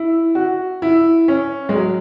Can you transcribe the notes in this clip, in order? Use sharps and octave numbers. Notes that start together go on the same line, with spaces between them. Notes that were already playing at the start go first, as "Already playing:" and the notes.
Already playing: E4
F#4
E4
C#4
G#3
F#3